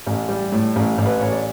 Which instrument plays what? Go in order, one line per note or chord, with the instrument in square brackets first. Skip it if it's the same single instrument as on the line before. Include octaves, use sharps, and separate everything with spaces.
[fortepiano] A1
G3
A2
A1
A1
B4
A1 C#5
D5